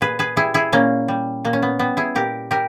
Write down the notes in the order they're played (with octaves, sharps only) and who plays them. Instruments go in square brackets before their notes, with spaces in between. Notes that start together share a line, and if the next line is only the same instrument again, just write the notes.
[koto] A#2 G#4 B4
G#4 B4
G3 E4 G#4
E4 G#4
A#2 A#3 C#4
G3
A#2 A#3
C#4
B3
G3 B3
E4 G#4
A#2 G4 A#4
G3 G4 A#4